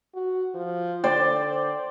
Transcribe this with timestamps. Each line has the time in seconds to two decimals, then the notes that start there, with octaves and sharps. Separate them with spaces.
0.14 F#4
0.54 F3
1.04 D3 C5 D5 G5